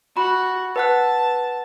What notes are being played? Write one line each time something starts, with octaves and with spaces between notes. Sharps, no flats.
F#4 B5
B4 F#5 A5 F#6